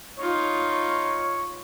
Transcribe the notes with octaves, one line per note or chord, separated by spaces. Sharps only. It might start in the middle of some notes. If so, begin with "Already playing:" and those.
D#4 F4 C#5